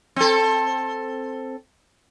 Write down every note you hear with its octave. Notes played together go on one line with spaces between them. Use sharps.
C4 A4